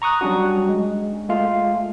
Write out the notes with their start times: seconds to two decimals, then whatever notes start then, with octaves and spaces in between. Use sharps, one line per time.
0.02 A#5 C#6 D#6 F#6
0.21 F#3 G3 C#4 D4 F#4
0.69 G#3
1.29 G#3 A3 F4 F5